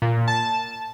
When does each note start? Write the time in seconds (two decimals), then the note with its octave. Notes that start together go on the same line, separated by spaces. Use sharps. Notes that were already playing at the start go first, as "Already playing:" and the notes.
0.02 A#2
0.28 A5